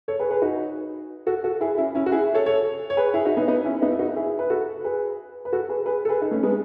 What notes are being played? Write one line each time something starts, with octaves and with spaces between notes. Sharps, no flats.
A4 C#5
G#4 B4
G#4 B4
D#4 F#4
F#4 A4
F#4 A4
E4 G#4
C#4 E4
C#4 E4
F#4
E4 G#4
A4 C#5
A4 C#5
C#5
G#4 B4
E4 G#4
D#4 F#4
B3 D#4
B3 D#4
C#4 E4
B3 D#4
E4
D#4 F#4
E4 G#4
B4
F#4 A4
G#4 B4
B4
F#4 A4
G#4 B4
G#4 B4
A4
G#4 B4
D#4
A3 C#4
G#3 B3